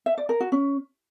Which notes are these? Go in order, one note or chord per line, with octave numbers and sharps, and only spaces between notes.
E5
D5
A#4
F#4
C#4